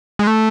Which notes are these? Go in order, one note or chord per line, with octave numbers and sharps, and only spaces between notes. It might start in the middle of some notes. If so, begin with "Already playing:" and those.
G#3
A3